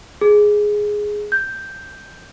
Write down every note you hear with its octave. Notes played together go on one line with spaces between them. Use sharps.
G#4
G6